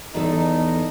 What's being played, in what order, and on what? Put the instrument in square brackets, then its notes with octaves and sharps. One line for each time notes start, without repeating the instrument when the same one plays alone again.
[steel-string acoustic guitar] E2 A4 [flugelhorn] D#4